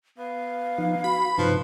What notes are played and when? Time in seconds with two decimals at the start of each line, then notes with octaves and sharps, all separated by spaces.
0.18 B3 F5
0.78 F3 D#4
1.04 F#4 B5
1.38 G2 C3 F3 D#4 B4